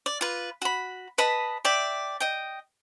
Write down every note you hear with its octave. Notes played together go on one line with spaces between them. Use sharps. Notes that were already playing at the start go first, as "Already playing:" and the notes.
D5
F4 B4
F#4 B5
B4 D#5 A5 B5
D5 E5 G5
D#5 G5